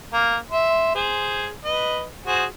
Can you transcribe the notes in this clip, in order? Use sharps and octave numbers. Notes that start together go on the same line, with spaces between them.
A#3
E5 C6
G#4 C5
B4 D#5
F#4 G#4 C5